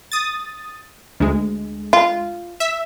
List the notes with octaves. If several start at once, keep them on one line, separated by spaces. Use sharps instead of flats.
D#6 A6
D2 G#3
F4
E5